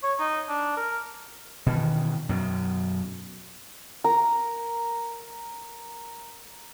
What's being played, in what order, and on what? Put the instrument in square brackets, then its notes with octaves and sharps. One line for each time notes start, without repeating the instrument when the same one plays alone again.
[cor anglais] C#5
D#4
D4
A#4
[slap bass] B2 D#3 E3
F#2 B2
[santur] A#4 A#5